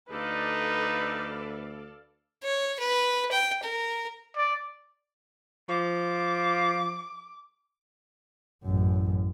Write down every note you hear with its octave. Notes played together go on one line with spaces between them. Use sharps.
D2 D#4 A4 B4 D5 F5
C#5
B4
G5
A#4
D5
F3 D6
A1 F#2